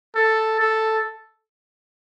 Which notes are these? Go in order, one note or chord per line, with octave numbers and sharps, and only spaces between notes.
A4
A4